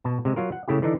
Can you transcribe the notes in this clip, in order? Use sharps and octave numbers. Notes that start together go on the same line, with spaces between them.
B2 A5
C3 G#3
F#3 F4 A#4
F#5
C#3 A3 E4 G4
D3 E3 D4 D#4